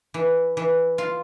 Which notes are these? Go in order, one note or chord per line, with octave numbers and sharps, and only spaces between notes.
E3
E3
F4